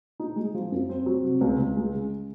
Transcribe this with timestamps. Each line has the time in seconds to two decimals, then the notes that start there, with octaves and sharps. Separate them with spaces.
0.20 D#4
0.36 G#3
0.54 F3
0.72 F#2
0.89 C4
1.06 F#3
1.24 C3
1.41 C#2
1.59 C#2
1.77 G#3
1.94 C#3